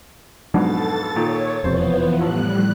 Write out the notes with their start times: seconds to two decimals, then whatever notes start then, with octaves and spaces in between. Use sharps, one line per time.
0.54 F2 G#2 B2 F#3 G#3 D4 A4 A6
1.16 A#2 D#3 C#5
1.64 E1 F2 C3 E3 F3 B3 C5
2.21 A1 A2 G3 F#6